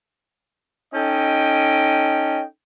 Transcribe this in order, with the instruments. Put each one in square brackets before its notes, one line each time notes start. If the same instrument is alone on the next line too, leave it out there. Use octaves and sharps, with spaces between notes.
[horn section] C#4 D#4 A4 D#5 G5